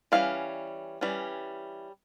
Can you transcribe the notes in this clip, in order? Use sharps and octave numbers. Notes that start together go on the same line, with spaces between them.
E3 G3 C#4 F5
E3 G3 C#4